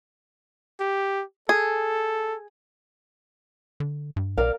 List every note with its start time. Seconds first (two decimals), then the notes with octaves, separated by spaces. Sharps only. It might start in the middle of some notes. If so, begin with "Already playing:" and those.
0.80 G4
1.49 G#4 A4
3.80 D3
4.16 G2
4.38 B1 A#4 D5 F5